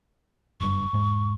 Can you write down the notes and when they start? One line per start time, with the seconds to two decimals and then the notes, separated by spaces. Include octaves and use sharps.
0.60 F#1 G2 C#6
0.93 E1 G#2 G#3